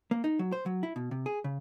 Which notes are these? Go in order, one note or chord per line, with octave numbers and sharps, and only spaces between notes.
A#3
D#4
F#3
C5
F#3
E4
B2
C3
G#4
C#3